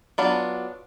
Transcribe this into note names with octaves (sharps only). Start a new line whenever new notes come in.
F#3 B3 D4 F4